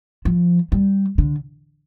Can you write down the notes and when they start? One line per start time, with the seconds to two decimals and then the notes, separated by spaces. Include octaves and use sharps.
0.25 F3
0.72 G3
1.18 D3